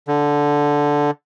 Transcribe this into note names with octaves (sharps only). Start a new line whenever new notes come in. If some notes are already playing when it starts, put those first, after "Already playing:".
D3